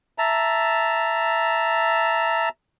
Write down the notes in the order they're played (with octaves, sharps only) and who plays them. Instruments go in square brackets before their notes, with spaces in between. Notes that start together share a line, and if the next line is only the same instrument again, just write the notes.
[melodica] E5 A5 A#5